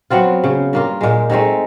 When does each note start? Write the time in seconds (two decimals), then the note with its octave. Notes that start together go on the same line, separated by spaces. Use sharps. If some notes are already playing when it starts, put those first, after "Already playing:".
0.10 F#3 B3 C4 F4
0.44 C#3
0.73 G2 A#3 F4
1.01 A#2 G#3
1.30 G#3 A3 C4 D#4